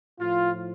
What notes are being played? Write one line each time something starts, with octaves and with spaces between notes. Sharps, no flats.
A2 F3 F4